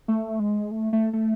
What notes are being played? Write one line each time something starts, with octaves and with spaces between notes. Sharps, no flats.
A3
G#3
A3
A3
A3